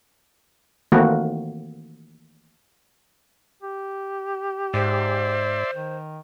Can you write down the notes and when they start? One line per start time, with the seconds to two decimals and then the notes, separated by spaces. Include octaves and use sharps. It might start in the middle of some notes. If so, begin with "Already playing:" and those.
0.92 D#3 E3 A3 A#3 C4 F#4
3.63 G4
4.74 G#2 C5 D5 E5 C6
5.74 D#3